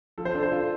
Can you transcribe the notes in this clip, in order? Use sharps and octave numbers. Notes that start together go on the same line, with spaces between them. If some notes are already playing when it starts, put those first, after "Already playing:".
F3 A4
C5
D4 A4
C5
F4